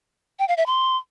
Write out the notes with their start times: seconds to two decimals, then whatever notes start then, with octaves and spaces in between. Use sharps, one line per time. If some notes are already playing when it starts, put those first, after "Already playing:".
0.39 G5
0.48 F5
0.57 E5
0.66 C6